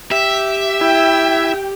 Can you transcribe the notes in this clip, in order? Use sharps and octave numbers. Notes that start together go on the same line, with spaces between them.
G4 E5
E4 G5